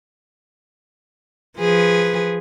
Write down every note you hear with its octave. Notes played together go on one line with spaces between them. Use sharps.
F3 G#4 B4